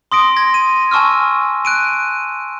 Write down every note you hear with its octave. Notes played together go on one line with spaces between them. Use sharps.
C6 D#6 A#6 D7
G#6 A#6
D#7
G#5 A5 C#6 E6 F6
F#6 D7 D#7